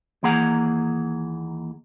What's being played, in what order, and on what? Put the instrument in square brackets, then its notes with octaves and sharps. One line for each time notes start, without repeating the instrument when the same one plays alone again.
[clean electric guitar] D#2 E3 A#3 G#4 F#5 A#5